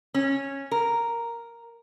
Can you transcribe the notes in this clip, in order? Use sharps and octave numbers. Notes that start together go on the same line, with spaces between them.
C#4
A#4